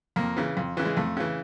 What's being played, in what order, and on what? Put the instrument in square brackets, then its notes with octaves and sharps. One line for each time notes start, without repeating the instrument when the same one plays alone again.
[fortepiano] F2 A#3
C#3 E3
F2
C#3 E3
G#3
F2 A3
C#3 E3